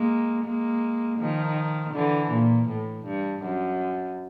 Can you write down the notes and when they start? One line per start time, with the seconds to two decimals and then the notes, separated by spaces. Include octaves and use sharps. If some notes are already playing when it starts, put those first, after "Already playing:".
Already playing: G#3 A#3
0.44 G#3 A#3
1.19 D#3 F3
1.93 D3 E3
2.30 A#2
2.68 A2
3.06 G2
3.43 F#2